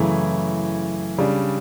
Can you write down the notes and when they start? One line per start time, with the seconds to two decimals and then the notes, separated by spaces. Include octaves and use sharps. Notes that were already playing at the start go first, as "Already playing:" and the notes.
Already playing: F#2 C#3 E3 A3 E4
1.18 C#3 G3 D4